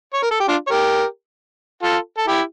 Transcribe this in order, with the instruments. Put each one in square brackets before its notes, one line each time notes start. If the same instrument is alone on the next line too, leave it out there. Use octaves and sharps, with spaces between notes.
[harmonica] C#5
A#4
A4
G4
D4 F4
C#5
G4 A#4
F4 A4
A4
E4 G4